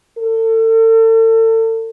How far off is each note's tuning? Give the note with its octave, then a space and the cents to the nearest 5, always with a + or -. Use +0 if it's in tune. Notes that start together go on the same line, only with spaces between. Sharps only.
A4 +35